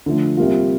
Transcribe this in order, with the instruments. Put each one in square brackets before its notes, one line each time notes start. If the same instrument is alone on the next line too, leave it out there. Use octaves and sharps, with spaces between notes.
[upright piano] D3 F3 A3
C3 G3 A#3 F4